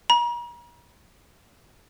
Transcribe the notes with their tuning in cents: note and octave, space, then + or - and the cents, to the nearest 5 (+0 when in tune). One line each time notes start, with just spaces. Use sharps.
A#5 +40